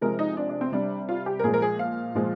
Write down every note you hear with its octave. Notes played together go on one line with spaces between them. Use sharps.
C3 F3 G#3 A#4
D#4
D4
D4
C4
C3 G3 D4
F4
G4
A#4
A#2 F3 G#3 G#4
A#4
G#4
F5
A#2 F3 G#3